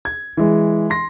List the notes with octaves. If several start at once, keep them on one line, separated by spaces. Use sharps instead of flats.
G#6
E3 G#3
C6 A#6